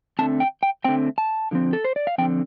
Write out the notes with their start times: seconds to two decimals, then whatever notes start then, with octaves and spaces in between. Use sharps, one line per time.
0.19 D3 A3 C4 A5
0.40 G5
0.63 G5
0.84 D3 A3 C4 G5
1.18 A5
1.51 D3 F3 C4
1.73 A4
1.84 C5
1.96 D5
2.07 F5
2.18 F3 C4 G5
2.21 D3